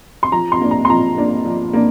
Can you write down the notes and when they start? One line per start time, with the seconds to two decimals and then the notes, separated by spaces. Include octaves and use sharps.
0.23 C6
0.32 F3 A#5
0.52 C6
0.61 A#3 D4
0.71 A#5
0.85 C6
0.90 F3 A#5
1.18 A#3 D4
1.45 F3
1.73 A#3 D4